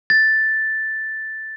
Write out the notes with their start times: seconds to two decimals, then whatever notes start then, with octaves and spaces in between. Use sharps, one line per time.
0.10 A6